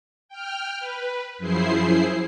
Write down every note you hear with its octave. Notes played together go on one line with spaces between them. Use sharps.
G5 F6
B4
F#2 F3 E4 G#4 C5 C7